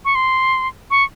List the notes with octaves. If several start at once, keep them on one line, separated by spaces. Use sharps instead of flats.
C#6
C6
C#6